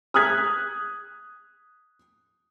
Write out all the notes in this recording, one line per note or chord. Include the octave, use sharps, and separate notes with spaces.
D#6 F6 F#6 G#6 B6